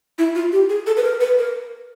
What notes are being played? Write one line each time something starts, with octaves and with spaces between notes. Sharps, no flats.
E4
F4
G4
G#4
A4
B4
A#4
B4
A#4